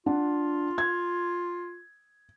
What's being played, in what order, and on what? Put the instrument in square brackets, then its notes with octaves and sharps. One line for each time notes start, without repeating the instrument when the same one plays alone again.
[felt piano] D4 F#5 [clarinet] F4
[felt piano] G#6